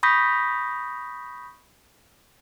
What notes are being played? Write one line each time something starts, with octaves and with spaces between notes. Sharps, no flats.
B5 C#6 D#6 G6 A#6 B6